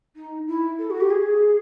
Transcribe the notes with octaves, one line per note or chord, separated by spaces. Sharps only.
D#4
E4
A4
F#4
G4
G#4